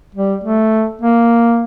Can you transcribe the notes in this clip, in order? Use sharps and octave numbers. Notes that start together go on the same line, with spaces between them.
G3
A3
A#3